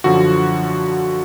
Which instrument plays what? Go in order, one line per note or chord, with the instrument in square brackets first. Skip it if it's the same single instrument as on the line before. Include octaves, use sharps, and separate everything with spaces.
[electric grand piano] F#2 D3 F3 F#4